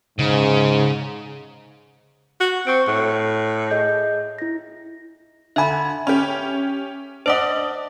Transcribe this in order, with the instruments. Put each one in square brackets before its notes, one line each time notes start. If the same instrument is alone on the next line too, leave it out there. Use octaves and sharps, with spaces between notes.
[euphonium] G#2 [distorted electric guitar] C#3
[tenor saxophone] F#4
[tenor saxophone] C4 [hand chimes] C#6 C#7 D7
[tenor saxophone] A2 [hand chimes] F#6
[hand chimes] G#4 D#5 G6
E4 A#6
[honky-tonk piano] D3 G#5 [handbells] E5 B5
[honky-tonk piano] C#4 G4
[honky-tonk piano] D4 D5 D#5 [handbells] C5 F#5